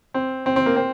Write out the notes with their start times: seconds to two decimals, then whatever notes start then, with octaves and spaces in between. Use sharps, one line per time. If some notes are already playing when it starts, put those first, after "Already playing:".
0.14 C4
0.46 C4
0.56 C4
0.66 A#3
0.76 C4